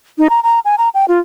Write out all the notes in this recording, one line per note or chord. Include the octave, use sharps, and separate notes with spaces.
D#4
A#5
A#5
G#5
A#5
G5
F4